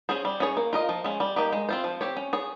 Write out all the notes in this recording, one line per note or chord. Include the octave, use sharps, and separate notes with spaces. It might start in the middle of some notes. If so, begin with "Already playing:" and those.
C#4 G#4 C5
G3
C#4 G#4 C#5
A#3
F4 A#4 D#5
F3
G#3 C#4
G3
A#3 D#4 G4
G#3
C4 F4 C5
F3
C4 G4 C#5
C#4
G#4 C#5